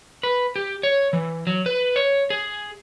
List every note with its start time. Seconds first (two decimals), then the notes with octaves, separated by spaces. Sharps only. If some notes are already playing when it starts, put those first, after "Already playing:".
0.23 B4
0.56 G4
0.83 C#5
1.13 E3
1.47 F#3
1.66 B4
1.96 C#5
2.30 G#4